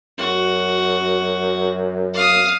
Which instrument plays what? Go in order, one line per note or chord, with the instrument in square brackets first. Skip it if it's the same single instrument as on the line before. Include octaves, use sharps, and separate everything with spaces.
[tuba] F#2 [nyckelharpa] F#4
[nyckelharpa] F5 D#6